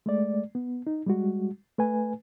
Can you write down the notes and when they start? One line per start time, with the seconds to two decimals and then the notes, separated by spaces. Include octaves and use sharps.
0.06 G#3 A3 D5
0.55 B3
0.87 D#4
1.06 G3 G#3 F#4
1.78 A3 B4 G#5